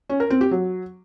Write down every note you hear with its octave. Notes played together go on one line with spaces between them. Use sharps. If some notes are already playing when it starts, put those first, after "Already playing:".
C#4
A#4
C4
G4
F#3